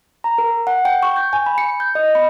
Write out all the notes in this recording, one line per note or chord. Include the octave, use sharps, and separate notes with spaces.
A#5
A#4
F#5
G5
C#6
G6
G#5
B5
C#7
G6
D#5
B5